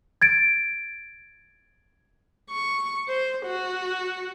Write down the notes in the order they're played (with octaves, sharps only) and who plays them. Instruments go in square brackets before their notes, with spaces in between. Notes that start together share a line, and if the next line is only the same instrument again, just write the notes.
[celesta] G#6 A6 D7
[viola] C#6
C5
F#4